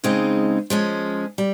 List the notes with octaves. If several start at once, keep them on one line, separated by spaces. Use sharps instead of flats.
C#3 G#3 C4 D#4
F3 G#3 C#4
G3